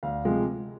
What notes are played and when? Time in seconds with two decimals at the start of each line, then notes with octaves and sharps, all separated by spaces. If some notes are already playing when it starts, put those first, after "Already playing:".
0.03 D2 F5
0.25 C3 F3 G#3